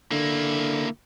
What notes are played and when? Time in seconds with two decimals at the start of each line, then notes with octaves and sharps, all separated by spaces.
0.12 D3 A#3 E4